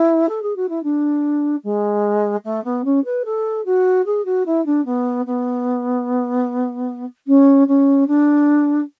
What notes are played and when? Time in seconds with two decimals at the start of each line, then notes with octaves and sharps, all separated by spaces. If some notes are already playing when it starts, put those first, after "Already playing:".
Already playing: E4
0.28 A4
0.42 G#4
0.56 F#4
0.69 E4
0.83 D4
1.63 G#3
2.45 A3
2.64 B3
2.84 C#4
3.04 B4
3.25 A4
3.65 F#4
4.05 G#4
4.25 F#4
4.46 E4
4.66 D4
4.85 B3
5.26 B3
7.27 C#4
7.68 C#4
8.07 D4